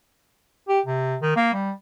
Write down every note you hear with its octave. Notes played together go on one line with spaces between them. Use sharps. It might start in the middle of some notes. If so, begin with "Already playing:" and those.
G4
C3
D#3
A#3
G3